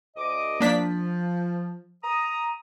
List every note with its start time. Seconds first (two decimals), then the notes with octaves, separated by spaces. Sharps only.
0.17 D2 D#5 D6
0.60 F3 A#3 D4 B6
2.04 A#5 D#6